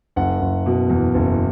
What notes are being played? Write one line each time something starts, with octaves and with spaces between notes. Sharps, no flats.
F#1 F#5
F#1
B2
E2
F#1